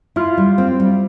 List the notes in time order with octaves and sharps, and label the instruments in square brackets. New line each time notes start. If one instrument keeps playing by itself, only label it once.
[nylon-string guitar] E4 [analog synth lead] F4
[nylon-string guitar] G3
C4
G3